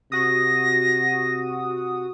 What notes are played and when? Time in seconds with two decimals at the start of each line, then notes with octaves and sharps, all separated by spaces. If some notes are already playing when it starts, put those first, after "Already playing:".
0.12 C3 F#4 D#6 A#6